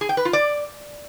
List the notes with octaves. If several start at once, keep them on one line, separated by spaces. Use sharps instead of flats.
G#4
G5
B4
F4
D5